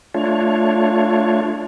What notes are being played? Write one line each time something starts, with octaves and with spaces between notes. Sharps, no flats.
A3 D4 F4 C#5